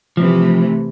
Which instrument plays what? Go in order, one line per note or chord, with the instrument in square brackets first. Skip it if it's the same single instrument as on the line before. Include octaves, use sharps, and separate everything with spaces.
[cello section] C3 E3 A3 [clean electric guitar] F3